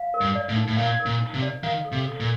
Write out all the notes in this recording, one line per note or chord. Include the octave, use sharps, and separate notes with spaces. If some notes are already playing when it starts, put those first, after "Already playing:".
Already playing: F5
A#4
G2
D5
A2
D#4
A2
A#2 F5
A#4
A#2
D#4
C3
D5
D#3 F5
A4
C3
A4
A#2